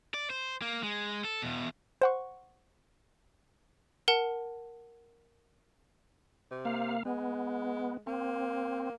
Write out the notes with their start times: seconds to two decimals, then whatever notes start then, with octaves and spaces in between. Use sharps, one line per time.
0.14 D5
0.30 C5
0.62 A#3
0.83 G#3
1.24 A4
1.42 E2 B2
2.01 C5 F#5 C#6
4.08 A#4 F#5 A5
6.51 C3
6.65 A#3 F5
7.05 G#3 B3
8.07 A#3 C4